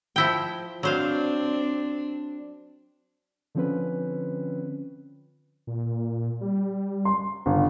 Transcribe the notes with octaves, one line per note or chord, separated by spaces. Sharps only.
F3 E4 G5
F#3 C4 D4 C5 F5
D3 F3 C4 C#4 B4
A#2
G3
C6
G1 C#3